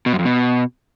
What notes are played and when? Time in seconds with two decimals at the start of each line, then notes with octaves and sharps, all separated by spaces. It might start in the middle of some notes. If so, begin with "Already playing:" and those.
0.06 B2
0.12 F#2
0.19 F2
0.25 B2